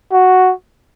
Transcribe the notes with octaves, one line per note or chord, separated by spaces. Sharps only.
F#4